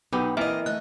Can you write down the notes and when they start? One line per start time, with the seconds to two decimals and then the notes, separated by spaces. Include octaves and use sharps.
0.13 B1 B3 D#4 G4
0.37 E3 A#3 C4 A#4 D#5 E5
0.66 A3 D#5 E5 F#6